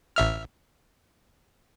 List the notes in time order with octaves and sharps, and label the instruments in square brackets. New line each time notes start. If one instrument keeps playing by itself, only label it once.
[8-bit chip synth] A1 E5 F6